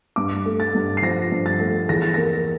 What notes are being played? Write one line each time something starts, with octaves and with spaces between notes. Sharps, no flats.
G2 D6
A3
A6
G2
C7
F3 A#6
G2
A6
A3
E2 A#6
A6
A#3 A#6